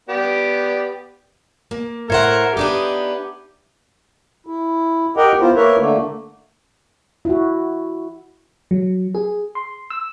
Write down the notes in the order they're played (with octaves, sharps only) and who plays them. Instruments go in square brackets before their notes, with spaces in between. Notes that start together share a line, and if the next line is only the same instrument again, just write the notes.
[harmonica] B3 G4 D5
[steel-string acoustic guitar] A#3
[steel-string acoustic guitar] A2 C5 F#5 [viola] A#4 [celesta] E5 G#6 C#7
[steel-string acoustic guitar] B3 D4 D#4 [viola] G4
[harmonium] E4
G4 A#4 D#5 F#5 G5
B3 E4 F4 C5
A#3 A#4 B4 C#5 E5
D3 A3 A#3
[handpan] E4 F#4
[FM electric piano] F#3
G#4
C6
E6